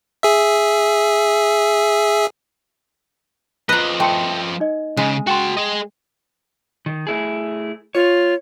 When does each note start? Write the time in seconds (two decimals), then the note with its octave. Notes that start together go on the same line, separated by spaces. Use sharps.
0.23 G#4 E5
3.69 F3 B4 D#5 A#5
4.00 A3 G5 C6 C#7
4.60 D#4 D#5
4.97 C#3 G#3
5.27 F#4 G5 A5 C6
5.57 G#4 D#5
6.86 D#3
7.07 A3 E4 G#4
7.95 F4 C#5